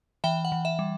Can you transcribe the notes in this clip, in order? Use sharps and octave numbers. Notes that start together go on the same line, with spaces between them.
E3 E5 G5
F#5
E3
E5
G3